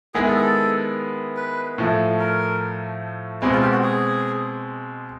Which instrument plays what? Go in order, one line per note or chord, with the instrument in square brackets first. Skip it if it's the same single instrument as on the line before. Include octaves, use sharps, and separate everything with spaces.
[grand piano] D#3 G#3 B3 E4 [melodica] G#4
[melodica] A4
G#4
A4
B4
[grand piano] A2 F3 A3
[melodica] A#4
[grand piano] B2 G#3 C4 [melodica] E4
[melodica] F4
G4
F#4
G#4